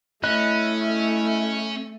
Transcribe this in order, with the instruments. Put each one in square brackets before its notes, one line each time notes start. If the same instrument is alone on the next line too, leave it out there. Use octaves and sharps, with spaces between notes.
[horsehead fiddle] A3 [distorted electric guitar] C#4 [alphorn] E4 [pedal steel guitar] D#5 B5 F#6